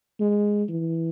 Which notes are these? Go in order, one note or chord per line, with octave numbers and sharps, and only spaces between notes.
G#3
E3